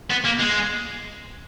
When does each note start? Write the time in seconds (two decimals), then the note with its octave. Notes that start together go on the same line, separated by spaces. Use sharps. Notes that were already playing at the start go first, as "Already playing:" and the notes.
0.11 B3
0.25 A#3
0.40 G#3